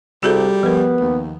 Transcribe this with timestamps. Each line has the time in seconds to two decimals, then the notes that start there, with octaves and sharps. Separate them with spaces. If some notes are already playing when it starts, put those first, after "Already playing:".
0.23 C2 G3 F#4 G#4 A4
0.63 F3 B3 A#4
1.00 D#2